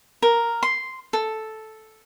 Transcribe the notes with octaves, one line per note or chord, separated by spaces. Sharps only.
A#4
C6
A4